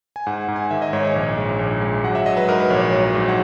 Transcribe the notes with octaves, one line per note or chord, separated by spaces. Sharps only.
G#5
G#2 F#5
G#2
G#5
D#3 E5
D#5
G#2 C#5
C#5
A#1
G#3
A#1
G#3
F#3 F#5
E5
F#3 D#5
B4
G#2 A#4
B4
A#1 C#5
C#5
F#3
G#2
F#5